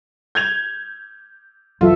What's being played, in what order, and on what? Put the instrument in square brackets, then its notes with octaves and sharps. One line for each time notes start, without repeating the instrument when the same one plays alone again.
[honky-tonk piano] G6 G#6 F7
[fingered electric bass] F1 B1 F#3 [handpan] E3 A4 E5 [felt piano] F4